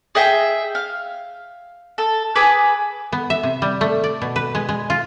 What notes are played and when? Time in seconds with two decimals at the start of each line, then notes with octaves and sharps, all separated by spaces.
0.15 G#4 D#5 E5 G5
0.75 F5
1.98 A4
2.35 G#4 B4 D6 E6
3.13 B3
3.30 E5
3.43 C3
3.62 G3
3.81 A3
4.04 D5
4.22 B2
4.36 B4
4.55 G#3
4.69 G#3
4.90 F4